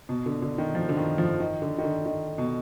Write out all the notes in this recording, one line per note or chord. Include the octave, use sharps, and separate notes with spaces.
B2
D3
D3
D#3
F3
D3
D#3
F3
D#3
D3
D#3
D3
D#3
B2